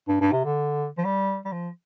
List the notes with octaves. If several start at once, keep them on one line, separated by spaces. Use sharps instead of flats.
G2
G2
C3
D3
F3
G3
G3
F3